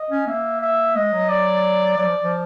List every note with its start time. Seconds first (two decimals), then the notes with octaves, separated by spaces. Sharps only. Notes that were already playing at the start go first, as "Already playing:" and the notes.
Already playing: D#5
0.10 C#4
0.27 A#3 E5
0.62 E5
0.95 G#3 D#5
1.13 F#3
1.29 D5
1.97 F#3 D5
2.06 F3
2.24 F3